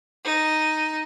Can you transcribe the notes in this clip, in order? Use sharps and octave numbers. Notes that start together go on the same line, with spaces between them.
D#4